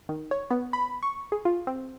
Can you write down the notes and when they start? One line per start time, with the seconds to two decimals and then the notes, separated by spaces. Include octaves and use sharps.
0.09 D#3
0.31 C#5
0.51 B3
0.73 B5
1.03 C#6
1.32 G#4
1.45 F4
1.67 C4